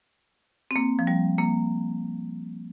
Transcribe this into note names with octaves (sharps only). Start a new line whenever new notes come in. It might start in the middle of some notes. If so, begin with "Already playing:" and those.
C4
A#3
F3
G3
A#3